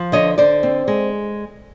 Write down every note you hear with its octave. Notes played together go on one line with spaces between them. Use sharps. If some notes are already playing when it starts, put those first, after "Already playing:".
Already playing: F3
D3 C#5 D#5
D3 C5 D5
C4
G#3